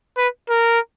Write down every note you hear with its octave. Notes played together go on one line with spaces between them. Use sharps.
B4
A#4